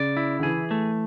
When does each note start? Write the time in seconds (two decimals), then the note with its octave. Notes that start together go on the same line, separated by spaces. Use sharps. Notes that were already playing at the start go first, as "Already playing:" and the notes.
Already playing: C#3 D5
0.17 E4
0.40 D3
0.43 E3 G#4
0.71 A3